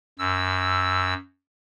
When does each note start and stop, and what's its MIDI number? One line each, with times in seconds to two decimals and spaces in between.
0.19 1.14 42
0.19 1.14 88